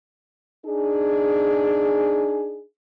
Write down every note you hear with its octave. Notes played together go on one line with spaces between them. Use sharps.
D4 D#4 G#4